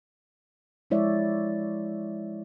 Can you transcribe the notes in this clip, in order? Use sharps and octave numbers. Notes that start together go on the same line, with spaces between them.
F3 G#3 E4 C#5 D5 E5